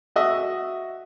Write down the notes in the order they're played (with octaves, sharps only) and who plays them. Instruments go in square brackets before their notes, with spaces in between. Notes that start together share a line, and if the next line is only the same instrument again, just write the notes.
[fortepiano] F#4 D#5 E5